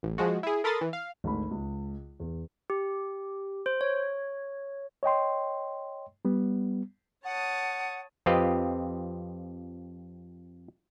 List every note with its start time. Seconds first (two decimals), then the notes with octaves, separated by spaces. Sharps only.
0.03 A1
0.18 F3 G#3 F#4
0.43 E4 G#4
0.64 A4 A#4 B5 C6 D#6 A6
0.81 E3
0.93 F5
1.24 G#1 D2 B5
1.51 C#2
2.20 E2
2.70 G4
3.66 C5
3.81 C#5
5.03 C#5 D#5 G5 C6
6.25 G3 B3
7.25 C#5 F#5 A5 D#6
8.26 F2 C4 F4 G4 B4 D#5